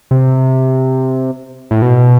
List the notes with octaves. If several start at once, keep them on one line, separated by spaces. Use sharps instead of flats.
C3
A2
B2